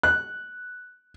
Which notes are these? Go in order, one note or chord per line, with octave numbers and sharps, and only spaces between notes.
F#6